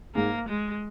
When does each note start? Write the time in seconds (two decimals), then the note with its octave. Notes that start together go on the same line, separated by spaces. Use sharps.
0.15 G#2 G#3 A#3
0.48 G#3